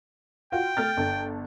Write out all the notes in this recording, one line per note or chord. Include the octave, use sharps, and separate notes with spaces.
F4 F#4 G5
A3 F6 A6
G1 A4